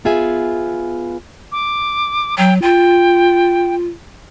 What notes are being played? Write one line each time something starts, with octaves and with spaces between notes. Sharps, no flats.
B3 F4 G#4 E5 G#5
D6
F#3 G5
F4 G5